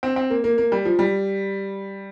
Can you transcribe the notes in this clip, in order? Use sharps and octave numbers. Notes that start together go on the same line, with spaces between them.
C4
C4
A#3
A#3
A#3
G3
F3
G3